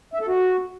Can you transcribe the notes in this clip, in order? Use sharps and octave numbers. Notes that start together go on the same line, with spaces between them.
E5
A4
F#4